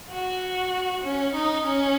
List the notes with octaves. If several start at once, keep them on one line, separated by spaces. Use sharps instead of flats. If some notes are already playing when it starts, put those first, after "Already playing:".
F#4
C#4
D#4
C#4